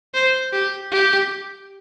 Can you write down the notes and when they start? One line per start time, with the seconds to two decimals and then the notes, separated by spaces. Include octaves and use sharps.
0.14 C5
0.53 G4
0.92 G4